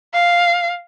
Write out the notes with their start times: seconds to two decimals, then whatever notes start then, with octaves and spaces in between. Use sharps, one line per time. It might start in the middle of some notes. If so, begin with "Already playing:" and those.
0.14 F5